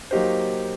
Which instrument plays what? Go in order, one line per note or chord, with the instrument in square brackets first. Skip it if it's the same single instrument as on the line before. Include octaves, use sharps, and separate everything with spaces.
[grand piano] F#3 A#3 D#4 G4 C5